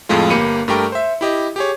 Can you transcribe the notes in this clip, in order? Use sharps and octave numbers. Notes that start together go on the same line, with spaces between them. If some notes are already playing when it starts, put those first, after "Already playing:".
F2 A2 G#3 A3 F4
G1 A#3 G4 B5 C#7 D#7
G2 A3 G4 A#4 G5 C#6
C5 E5
E4 G4 D#5
G4 G#4 C#5